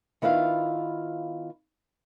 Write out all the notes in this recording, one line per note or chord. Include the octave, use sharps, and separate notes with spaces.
D#3 B3 E4 F4 F5